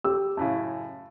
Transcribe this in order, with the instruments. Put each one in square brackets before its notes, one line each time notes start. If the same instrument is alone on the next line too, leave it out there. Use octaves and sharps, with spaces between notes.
[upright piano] G4 E6
[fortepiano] F#2 A2 C#3 [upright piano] A5